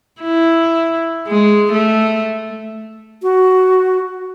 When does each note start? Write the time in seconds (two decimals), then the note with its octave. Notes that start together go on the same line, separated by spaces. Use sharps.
0.21 E4
1.28 G#3
1.72 A3
3.23 F#4